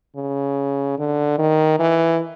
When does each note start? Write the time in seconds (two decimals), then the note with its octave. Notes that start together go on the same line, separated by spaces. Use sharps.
0.16 C#3
0.98 D3
1.38 D#3
1.79 E3